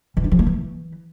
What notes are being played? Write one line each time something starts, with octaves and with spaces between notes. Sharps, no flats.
E3
D4
F3
A#3
E3